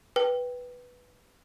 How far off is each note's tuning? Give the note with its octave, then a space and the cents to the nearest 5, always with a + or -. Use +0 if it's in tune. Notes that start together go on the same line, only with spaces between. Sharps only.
B4 +0 G5 +0